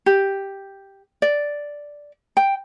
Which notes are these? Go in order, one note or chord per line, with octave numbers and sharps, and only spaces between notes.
G4
D5
G5